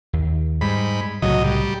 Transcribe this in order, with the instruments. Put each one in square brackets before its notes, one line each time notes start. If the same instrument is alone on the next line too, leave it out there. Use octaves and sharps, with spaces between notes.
[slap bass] D#2
[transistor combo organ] G#2 B5 [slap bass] G3
[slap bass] C2 A2 C#3 [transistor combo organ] F#3 D#5
[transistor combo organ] G3